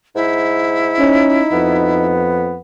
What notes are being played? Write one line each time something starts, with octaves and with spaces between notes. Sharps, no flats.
G#2 E4
C#4 D#4
F2 B3